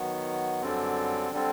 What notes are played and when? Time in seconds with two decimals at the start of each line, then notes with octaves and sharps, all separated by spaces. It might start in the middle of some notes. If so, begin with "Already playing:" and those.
Already playing: D#3 F#3 B3
0.62 F#2 D3 G3 C4
1.32 D3 G3 C4